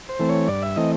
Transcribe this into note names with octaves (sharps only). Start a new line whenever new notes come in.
C5
E3 A3 C4
C#5
G2 D5
E5
E3 A3 C4 D#5